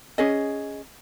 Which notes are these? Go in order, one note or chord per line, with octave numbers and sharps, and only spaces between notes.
C#4 G#4 D#5